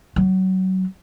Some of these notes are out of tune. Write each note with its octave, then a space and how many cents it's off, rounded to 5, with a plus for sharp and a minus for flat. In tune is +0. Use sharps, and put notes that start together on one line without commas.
F#3 +25